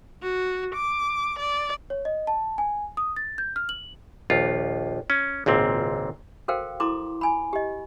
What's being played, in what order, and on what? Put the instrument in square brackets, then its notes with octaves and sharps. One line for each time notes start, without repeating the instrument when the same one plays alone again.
[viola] F#4
D6
D5
[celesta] C#5
D#5
A5
G#5
D#6
A6
G6
F6
F#7
[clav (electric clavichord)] A#1 D#2 F4
C#4
G#1 C#2 A#2 C4
[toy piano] F#4 A4 A#4 C5 F5 G5
E4 A4 A#5 C6 D6
G#5 B5
G4 D#5